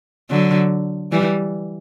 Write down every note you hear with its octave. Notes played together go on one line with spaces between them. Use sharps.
D3 F#3
E3 G3